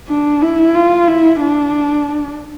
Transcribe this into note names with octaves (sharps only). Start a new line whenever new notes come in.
D4
E4
F4
E4
D4